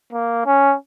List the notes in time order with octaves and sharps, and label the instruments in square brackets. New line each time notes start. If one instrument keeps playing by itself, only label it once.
[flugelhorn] A#3
C#4